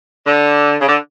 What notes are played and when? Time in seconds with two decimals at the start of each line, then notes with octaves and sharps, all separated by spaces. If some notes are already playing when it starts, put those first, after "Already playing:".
0.27 D3
0.80 C#3
0.88 D3